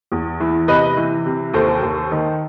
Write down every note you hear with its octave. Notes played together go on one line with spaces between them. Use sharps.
E2
E3
C3 B4 D#5
E3
C3
D#2 A4 C5
D#2
D#3